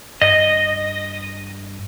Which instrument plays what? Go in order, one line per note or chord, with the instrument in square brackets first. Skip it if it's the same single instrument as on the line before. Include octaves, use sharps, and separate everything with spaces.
[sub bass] G2 [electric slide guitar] D#5